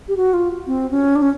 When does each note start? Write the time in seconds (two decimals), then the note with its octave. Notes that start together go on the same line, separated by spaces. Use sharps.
0.08 G4
0.17 F#4
0.34 F4
0.67 C4
0.91 C#4
1.16 D4
1.22 C#4